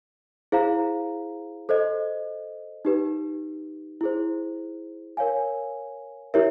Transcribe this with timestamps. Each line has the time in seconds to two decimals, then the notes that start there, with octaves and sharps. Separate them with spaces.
0.52 E4 G#4 C5 F5 A#5
1.69 A4 C5 D#5
2.85 D#4 G4 B4
4.01 E4 G#4 C5
5.17 A#4 C#5 F5 G#5
6.34 E4 G4 A#4 C#5 E5